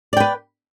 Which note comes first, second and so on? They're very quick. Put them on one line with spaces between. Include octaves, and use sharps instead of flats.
D5 G5 B4